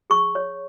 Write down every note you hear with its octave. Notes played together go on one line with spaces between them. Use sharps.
G#4 C#6
C#5